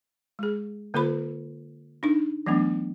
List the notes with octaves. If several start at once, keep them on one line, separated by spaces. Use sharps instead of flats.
G#3 G#4
D3 A#3 F4 A4 C5 B5
D4 D#4
E3 F#3 A3 B3 D4